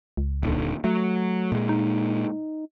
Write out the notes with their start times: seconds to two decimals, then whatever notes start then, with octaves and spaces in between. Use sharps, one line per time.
0.17 C#2
0.43 D#1 D#2 D3
0.84 F#3 A3
1.52 A#2 G#3
1.69 D#4